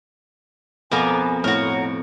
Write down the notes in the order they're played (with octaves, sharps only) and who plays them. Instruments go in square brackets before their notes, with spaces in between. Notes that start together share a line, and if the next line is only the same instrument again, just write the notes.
[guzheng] F2 B2 B3 [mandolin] A#4 F5 D6 [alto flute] G#5
[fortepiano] A2 [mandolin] F#4 A#4 [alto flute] C#5